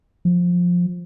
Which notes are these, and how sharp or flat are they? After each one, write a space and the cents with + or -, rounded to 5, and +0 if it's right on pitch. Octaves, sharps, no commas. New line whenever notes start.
F3 +15